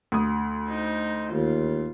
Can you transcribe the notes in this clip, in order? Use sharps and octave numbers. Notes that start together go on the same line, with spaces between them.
D2 D#6
D#4 C5
D#2 F4